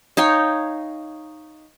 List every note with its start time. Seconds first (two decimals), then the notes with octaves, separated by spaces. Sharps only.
0.17 D#4 C#5 F5 G5